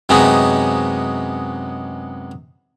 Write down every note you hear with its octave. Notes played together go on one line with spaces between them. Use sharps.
F#2 C3 G#3 B3 C#4 D#4